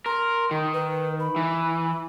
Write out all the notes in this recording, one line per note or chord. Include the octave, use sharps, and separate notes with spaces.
A#4 C6
D#3
B4
B5
E3